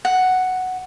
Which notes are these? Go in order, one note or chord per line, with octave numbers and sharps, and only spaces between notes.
F#5